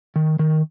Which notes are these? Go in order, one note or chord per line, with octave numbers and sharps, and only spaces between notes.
D#3
D#3